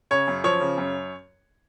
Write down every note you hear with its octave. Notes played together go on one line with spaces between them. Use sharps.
C#3 C#5
F#2
F3 C#5
C#3
F#2